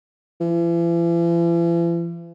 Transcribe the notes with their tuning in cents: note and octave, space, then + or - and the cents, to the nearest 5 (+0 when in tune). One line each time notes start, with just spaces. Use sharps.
E3 +45